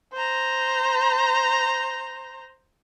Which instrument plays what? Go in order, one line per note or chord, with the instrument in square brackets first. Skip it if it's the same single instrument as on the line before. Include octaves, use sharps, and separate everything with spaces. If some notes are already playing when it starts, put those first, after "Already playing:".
[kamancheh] C5 A#5